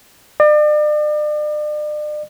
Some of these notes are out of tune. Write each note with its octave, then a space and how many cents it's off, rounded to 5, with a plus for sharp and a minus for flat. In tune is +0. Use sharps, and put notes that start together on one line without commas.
D5 +40